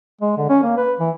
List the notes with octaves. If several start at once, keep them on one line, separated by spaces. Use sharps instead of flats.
G#3
D3
C#4
A#3
B4
E3